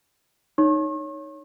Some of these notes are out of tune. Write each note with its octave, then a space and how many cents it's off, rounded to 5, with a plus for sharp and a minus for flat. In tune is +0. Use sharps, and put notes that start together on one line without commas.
D#4 -10 C#5 +5 C#6 -45